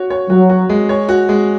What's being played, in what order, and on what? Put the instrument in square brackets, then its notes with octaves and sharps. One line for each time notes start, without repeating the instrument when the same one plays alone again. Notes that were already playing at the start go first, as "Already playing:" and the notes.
Already playing: [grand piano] F#4 C#5
C#5
[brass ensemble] F#3 [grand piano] F#4
[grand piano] F#4
G#3
C#5
F#4
G#3